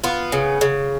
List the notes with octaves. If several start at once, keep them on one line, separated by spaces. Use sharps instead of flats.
B3 F4
C#3
C#3